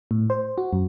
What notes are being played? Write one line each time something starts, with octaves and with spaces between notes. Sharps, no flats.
A2
C5
F#4
F#2